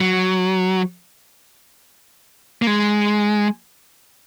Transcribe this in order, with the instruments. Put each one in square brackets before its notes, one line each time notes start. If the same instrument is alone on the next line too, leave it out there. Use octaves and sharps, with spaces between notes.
[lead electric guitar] F#3
A#3
G#3